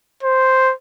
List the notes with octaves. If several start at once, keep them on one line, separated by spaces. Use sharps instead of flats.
C5